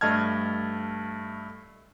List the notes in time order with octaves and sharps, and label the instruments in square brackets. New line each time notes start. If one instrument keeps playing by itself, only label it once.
[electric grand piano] G2 A3 D#5 A5 F6 G#6